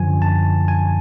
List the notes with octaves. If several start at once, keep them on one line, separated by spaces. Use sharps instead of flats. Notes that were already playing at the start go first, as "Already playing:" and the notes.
Already playing: F#2 D3 F3 G#5
A5
G#5